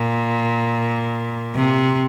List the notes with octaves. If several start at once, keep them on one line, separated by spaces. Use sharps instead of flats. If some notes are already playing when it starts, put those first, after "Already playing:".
Already playing: A#2
C3